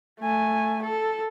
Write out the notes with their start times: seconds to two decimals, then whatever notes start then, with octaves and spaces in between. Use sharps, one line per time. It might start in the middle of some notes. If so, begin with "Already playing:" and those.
0.20 A3 G#5
0.83 A4